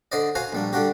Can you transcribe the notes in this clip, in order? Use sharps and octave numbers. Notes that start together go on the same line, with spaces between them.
D3 C5 D5 D#5
F4 F#4 C5 G#5 A#5
A#1 G3 D4
D3 G3 D4 F#4 G4